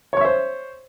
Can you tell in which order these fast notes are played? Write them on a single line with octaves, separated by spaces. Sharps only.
C#5 C#6 E5 C5